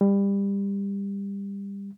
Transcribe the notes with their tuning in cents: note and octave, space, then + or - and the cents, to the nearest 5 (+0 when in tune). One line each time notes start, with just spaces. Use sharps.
G3 +25